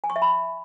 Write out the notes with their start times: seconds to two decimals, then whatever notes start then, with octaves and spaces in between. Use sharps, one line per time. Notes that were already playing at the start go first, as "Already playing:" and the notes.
0.04 G#5
0.10 C#6
0.16 E5
0.22 B5